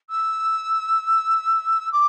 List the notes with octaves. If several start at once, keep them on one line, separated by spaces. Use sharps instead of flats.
E6
D6